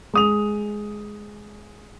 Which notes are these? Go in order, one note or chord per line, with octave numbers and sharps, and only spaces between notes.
G#3 D#6 F7